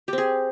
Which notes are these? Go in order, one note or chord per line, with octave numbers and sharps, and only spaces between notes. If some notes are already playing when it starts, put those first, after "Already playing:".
C4 G4 G#4